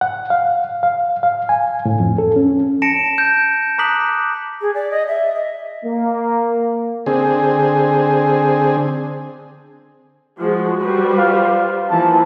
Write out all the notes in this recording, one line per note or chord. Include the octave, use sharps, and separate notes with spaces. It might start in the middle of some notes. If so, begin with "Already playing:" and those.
F#5
F5
F5
F5
G#5
A2
F2
A4
C#4
A5 A#6 C#7 D7 E7
G6
A#5 D6 D#6 F#6 B6 F#7
G#4
D5
D#5
E5
D#5
A#3
D3 C4 G#4
F3 G#3 F#4
G3 B4 C5
F4
E3 F3 A#3 A5